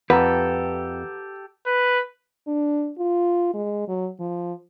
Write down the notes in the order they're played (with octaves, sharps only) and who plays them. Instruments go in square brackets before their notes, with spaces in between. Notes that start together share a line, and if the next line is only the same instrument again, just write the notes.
[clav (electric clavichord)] F2 [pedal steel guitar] G4 A4 [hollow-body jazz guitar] B4 [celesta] F#5 A#5
[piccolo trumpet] B4
[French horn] D4
F4
G#3
F#3
F3